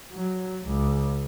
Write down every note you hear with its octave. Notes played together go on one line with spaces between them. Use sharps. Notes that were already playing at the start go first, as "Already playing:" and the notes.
F#3
C#2